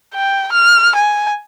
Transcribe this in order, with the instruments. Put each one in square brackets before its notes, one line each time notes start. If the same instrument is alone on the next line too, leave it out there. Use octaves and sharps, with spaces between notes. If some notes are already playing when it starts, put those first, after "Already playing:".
[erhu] G5
F6
G#5